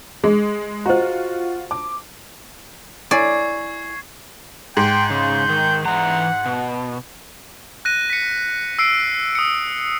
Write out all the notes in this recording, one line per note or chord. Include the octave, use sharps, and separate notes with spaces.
G#3 G#4
F4 F#4 C5 D#5 A#5
A5 D6
E4 C#5 D5 G#5 C#6 G#6 C7
G#2 G5
C#3 G6
D#3
E3 F#5 A#5
B2
F#6 A#6 D#7
B6 C#7
E6 C7 D7
D#6 C#7